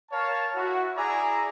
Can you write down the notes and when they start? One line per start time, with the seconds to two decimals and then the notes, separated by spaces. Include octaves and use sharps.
0.11 A#4 C#5 F5 A5
0.55 E4 F#4
0.96 E4 G#4 D5 G#5 A#5